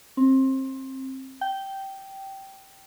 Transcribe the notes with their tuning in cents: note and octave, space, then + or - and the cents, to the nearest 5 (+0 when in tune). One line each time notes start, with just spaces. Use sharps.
C4 +25
G5 -10